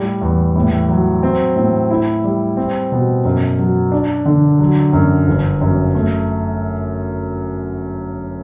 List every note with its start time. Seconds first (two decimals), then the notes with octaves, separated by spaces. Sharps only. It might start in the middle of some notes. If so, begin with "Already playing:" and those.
Already playing: A2 G3
0.22 E2
0.56 A2
0.89 F#3
1.23 C4
1.56 A2
1.90 E4
2.24 G3
2.57 C4
2.92 B2
3.25 F#2
3.59 F#3
3.92 D4
4.26 D3
4.59 F#3
4.93 F#2
5.27 G1
5.61 F#2
5.95 A3